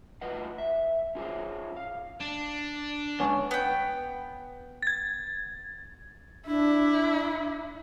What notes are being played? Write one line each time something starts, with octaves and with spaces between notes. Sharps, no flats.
E2 A2 F4 B4 D#5 F#5
E5
C#4 F4 G#4 A4 C5 C#5
F5
D4
G#2 D3 B3 C#4
B3 G5
G#6 A6
D4 E4